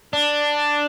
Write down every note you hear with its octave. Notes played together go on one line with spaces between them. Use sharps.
D4